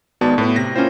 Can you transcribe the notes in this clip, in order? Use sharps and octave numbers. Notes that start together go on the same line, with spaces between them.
G#1 G#2 B3 F#4 D5 A5
A2 B3
C3 A#6
A#3 C#4 E4 F4 C5 G5